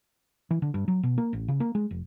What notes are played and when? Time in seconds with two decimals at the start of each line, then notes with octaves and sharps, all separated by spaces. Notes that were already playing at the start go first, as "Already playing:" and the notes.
0.51 E3
0.62 D3
0.74 G2
0.88 F#3
1.03 B2
1.18 A#3
1.33 A1
1.48 C#3
1.60 A#3
1.75 G#3
1.91 F1